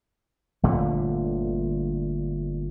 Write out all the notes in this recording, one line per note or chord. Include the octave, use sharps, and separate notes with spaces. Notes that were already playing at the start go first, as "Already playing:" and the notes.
G1 A#2 D3 A3